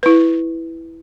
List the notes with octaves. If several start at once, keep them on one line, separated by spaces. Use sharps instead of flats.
E4 B4